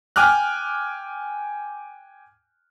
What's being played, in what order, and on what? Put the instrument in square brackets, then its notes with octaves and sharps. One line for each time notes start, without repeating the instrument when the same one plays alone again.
[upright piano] G5 G#5 D6 F6 F#6